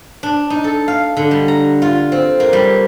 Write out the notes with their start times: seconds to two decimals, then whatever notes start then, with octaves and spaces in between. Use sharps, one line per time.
0.23 D4
0.50 D#4
0.64 A4
0.88 F5
1.17 D3
1.31 G3
1.48 A#5
1.82 F4
2.12 C4
2.40 A#3
2.53 G3